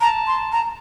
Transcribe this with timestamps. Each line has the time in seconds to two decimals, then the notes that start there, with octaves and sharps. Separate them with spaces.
0.01 A5 A#5
0.27 C6
0.52 A#5